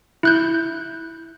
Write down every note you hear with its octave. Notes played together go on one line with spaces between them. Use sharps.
E4 F#6 G6